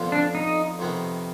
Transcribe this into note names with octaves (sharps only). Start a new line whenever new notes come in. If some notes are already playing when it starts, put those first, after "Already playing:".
Already playing: F2 D3 F3 B3 F4
D4
D#4
F2 C3 D#3 B3 D#4